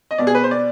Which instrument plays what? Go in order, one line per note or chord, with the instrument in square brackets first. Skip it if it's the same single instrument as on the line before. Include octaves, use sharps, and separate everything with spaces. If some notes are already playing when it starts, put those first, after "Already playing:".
[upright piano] D#5
B2 B3 D5
G#4
B4
C5
D5